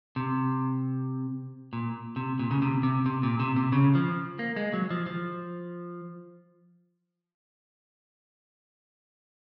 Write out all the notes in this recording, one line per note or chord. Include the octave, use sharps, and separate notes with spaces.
C3
A#2
C3
A#2
C#3
C3
C3
C3
A#2
C3
C3
C#3
F3
A#3
G#3
F#3
F3
F3